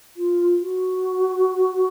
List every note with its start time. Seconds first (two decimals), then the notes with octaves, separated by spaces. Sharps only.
0.17 F4
0.60 F#4